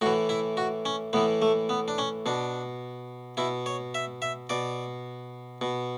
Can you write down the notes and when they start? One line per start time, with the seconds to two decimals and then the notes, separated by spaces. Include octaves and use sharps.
0.01 A2 F#4
0.06 E3
0.29 E4
0.57 F#4
0.85 C#4
1.13 A2 E3 B3
1.42 A3
1.69 B3
1.88 D4
1.98 C#4
2.26 B2 D4
3.37 B2 E4
3.66 C#5
3.94 E5
4.22 E5
4.49 B2 D5
5.61 B2